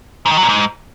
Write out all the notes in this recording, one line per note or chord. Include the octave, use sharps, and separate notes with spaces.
G#2
D#3
F#3
A#2
G#2